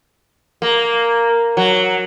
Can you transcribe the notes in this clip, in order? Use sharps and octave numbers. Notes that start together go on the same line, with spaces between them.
A#3
F#3